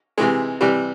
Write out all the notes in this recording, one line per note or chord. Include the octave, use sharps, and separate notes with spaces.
C3 E3 G#3
C3 E3 G3